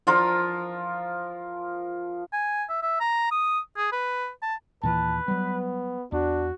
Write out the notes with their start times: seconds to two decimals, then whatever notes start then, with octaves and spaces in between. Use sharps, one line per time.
0.07 F3 F4 A#4
2.33 G#5
2.69 E5
2.82 E5
3.00 A#5
3.31 D#6
3.77 G#4
3.92 B4
4.42 A5
4.83 D#2 A#2 E3 B4 A5
5.28 F#3 G3 B3
6.12 E2 D4 F#4